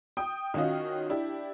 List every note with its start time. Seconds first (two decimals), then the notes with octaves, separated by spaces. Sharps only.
0.17 G5 D#6
0.54 D#3 C#4 F4 F#4 D#5
1.09 D4 E4 G4